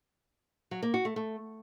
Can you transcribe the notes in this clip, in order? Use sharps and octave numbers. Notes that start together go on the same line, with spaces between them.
F#3
A#3
F#4
A3
A3